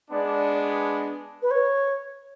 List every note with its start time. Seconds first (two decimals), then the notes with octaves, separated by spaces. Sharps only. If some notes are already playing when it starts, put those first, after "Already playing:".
0.11 G#3 B3 D4 D5
1.42 B4
1.51 C#5